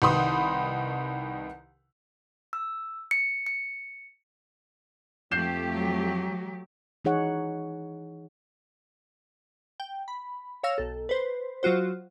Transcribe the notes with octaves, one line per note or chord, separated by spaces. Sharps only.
C2 D#3 B4 B5 C6 D#6
E6
C#7
C#7
F2 F3 A3 G4 G6 C7 E7
F#3
E3 D#4 G#4 C#5 F#5
G5
B5
C#5 F5 E6 A#6
B1 A4
B4 C5
F#3 F4 F#4 C5